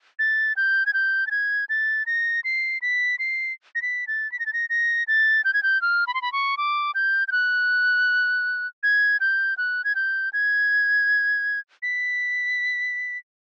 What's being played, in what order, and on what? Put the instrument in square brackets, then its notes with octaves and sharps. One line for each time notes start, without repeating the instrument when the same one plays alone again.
[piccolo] A6
G6
G#6
G6
A6
G#6
A6
A#6
C7
B6
C7
A#6
B6
A6
B6
A#6
A6
A#6
A#6
A6
G6
G#6
G6
F6
B5
C6
B5
C#6
D6
G6
G6
F#6
G#6
G6
F#6
G#6
G6
G#6
B6